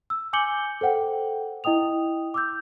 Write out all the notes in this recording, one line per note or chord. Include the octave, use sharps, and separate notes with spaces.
E6
G#5 D6 G6 C#7 F#7 G7
A4 C5 F#5 G5
E4 D#5 G5 D#6 F7
D6 E6 G6